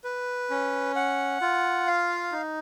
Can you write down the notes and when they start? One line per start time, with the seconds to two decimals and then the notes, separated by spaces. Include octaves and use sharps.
0.04 B4
0.50 C#4
0.96 F#5
1.41 F4
1.87 F5
2.32 D#4